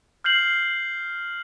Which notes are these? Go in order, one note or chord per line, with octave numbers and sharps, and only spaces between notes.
F6 G6 C7 F#7